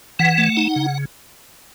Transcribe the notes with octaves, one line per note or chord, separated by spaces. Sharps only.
E3 F#5
A3
D#4
C#3